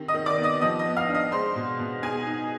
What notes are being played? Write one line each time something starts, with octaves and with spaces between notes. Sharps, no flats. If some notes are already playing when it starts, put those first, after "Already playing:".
Already playing: C3 D#3
D#5 D#6
D#3
D5 D6
B3
D#5 D#6
F3 D#5 D#6
D#5 D#6
B3
F5 F6
D4
D#5 D#6
G#3 C5 C6
B2
B2
D#4 G#4 G#5
D#4